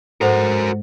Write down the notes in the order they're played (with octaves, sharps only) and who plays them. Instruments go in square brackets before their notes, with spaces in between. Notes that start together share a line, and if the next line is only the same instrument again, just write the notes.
[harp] G#2 [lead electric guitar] F#4 A#4 [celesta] A4 C5 F#5